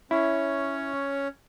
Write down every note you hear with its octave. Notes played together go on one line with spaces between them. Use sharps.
C#4 E4 C#5